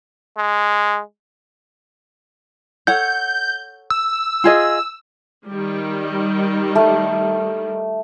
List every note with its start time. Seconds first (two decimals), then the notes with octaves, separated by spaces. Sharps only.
0.38 G#3
2.87 A4 C#5 F#5 G6
3.90 E6
4.44 F4 G#4 D#5
5.48 D#3 G3
6.75 A3